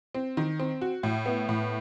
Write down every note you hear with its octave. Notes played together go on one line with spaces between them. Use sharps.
C4
D#3
C4
F#4
A2
B3
A2